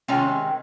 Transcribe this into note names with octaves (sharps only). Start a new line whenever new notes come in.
C3 D#3 G#3 C#4 F4